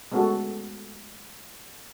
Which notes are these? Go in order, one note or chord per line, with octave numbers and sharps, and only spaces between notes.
G#3 A3 B3 C#4 F#4 A4